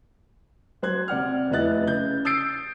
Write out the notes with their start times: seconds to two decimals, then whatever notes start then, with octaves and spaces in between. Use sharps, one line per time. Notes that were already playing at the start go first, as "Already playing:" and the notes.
0.82 F#3 C5 F#6 G#6
1.08 C3 D5 F#5 F6
1.50 F1 B3 E4 D#5 F#6 A6
1.83 C#3 G6
2.25 D#6 E6 G6 A6 C7 D7